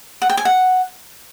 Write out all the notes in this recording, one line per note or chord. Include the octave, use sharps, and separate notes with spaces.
F#5
G5
G#5
F#5